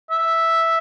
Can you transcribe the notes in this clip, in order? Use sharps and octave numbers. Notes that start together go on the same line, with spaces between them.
E5